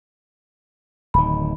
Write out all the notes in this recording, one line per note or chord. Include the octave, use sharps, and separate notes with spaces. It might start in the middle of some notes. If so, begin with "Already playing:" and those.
D1 D#3 B5